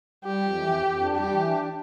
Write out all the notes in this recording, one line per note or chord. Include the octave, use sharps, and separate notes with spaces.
G3 G4
F2
E3
F2
F2
D4
G3 G4
E3
D4